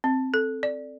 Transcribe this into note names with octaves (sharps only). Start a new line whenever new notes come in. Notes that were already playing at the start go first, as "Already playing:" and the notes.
C4
A4
D5